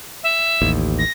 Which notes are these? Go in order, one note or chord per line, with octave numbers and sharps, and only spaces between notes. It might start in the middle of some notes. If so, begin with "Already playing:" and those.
E5
A1 D#2
A#6